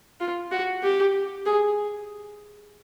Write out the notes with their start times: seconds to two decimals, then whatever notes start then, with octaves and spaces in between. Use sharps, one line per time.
0.20 F4
0.51 F#4
0.83 G4
1.46 G#4